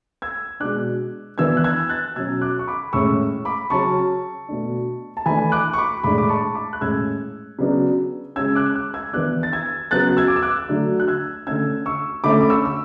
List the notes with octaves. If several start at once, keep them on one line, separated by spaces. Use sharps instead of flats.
E6 G#6
B2 G#3 D4 D6 F#6
E3 B3 D4 E6 G#6
F#6
E6 G#6
F#6 A6
B2 F#3 C#4 E6 G#6
D6 F#6
C#6
B5 D6
A2 G#3 C#4 C#6 E6
B5 D6
C#3 F#3 C#4 A5 C#6
B2 A3 D4
A5
E3 A3 D4 G#5 B5
D6 F#6
C#6
B5 D6
A2 G#3 D4 B5 D6
D6
A5 C#6
B5 D6
F#6
A2 G#3 C#4 E6 G#6
C#3 F#3 B3 D4
C#3 G#3 C#4 E6 G#6
D6 F#6
D6 F#6
E6 G#6
E3 B3 D4 D6 F#6
A6
E6 G#6
C#3 F#3 B3 F#6 A6
A6
E6 G#6
D6
E6
D6 F#6
D3 F#3 A3 D4
F#6
E6 G#6
D3 A3 C#4 E6 G#6
C#6 E6
D3 A3 C#4 B5 D6
D6
C#6 E6
E6